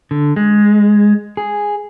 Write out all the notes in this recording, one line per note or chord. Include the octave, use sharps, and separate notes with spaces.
D3
G#3
G#4